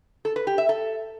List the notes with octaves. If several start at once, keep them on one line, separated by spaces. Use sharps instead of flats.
A4
B4
G4
E5
A4